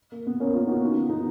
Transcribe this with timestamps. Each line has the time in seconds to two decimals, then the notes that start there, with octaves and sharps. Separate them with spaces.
0.12 A#3
0.27 B3
0.40 A#3 C#4
0.53 C#4 F4
0.67 D#4 F#4
0.81 B3
1.09 B3 D#4